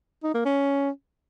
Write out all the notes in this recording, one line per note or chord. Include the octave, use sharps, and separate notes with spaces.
D#4
A#3
C#4